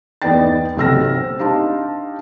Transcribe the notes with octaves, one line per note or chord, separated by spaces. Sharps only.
E2 B3 D#4 D5 G5 A6
B1 C3 G5 E6 F6 A#6
C4
D4 D#4 G4 F5 A5 C6